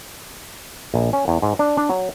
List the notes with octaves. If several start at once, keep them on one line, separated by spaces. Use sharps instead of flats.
A#1
C#4
E2
G#2
D4
D4
F#3